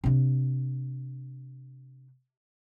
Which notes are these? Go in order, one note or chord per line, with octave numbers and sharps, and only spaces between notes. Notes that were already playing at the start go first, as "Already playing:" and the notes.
C3 D4